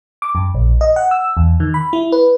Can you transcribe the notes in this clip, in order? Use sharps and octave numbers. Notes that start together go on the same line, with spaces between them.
D6
F#2
A#1
D#5
F#5
E6
E2
D#3
B5
E4
B4